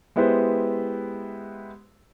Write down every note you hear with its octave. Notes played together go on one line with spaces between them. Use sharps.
G#3 B3 E4 G4 B4 C5